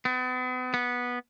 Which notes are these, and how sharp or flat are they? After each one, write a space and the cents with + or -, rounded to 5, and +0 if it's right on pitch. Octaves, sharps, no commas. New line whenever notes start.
B3 +40
B3 -10